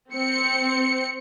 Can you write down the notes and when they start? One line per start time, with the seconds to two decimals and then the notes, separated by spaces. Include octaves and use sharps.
0.13 C4 C#7